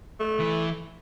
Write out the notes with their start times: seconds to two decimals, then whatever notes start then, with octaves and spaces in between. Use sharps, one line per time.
0.20 A3
0.40 E3